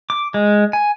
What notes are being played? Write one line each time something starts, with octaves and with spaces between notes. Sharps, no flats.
D6
G#3
G#5